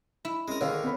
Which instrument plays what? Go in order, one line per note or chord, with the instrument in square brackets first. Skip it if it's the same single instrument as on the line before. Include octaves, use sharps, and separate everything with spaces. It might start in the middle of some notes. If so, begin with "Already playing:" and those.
[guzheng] E4
[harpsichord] G#3 A#4 [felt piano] C#4
[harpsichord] D3 D#3 [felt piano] G#4 [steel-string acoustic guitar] C#5 F5
[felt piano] B3 B5